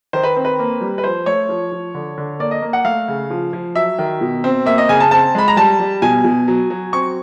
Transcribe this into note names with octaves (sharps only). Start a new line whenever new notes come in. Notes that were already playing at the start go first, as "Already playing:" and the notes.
D#3 C5
B4
C4
B4
A#3
G3
B4
F3 C5
A3 C#5
F3
F3
D3
D3
A#3 D5
D#5
A#3
F#5
A3 F5
C#3
F3
F3
F#3 E5
D#3
B2
C4
A#3 E5
D#5
C#3 G#5
A5
C4 A5
G#3 B5
A#5
G3 A5
G3
B2 G#5
B2
F#3
F#3
C4 C#6